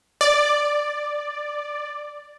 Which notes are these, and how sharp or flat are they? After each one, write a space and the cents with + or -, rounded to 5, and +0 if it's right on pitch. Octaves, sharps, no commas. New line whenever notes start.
D5 +5